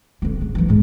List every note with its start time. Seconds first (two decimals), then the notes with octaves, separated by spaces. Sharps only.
0.22 D3 C4
0.41 C#3
0.55 E3 F3
0.69 F2 G#2